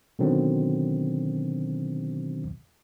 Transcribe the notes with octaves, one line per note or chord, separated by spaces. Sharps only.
B2 D3 D#3 F#3 C4